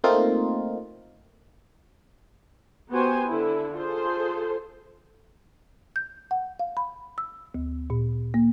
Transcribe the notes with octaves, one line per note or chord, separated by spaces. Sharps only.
A3 A#3 C4 D#4 F4 A#4
B3 F#4 G4 C5 G#5
D3 E4
F4 G#4 A4 C5
G6
F#5
F5
B5
E6
D2
A#2
A#3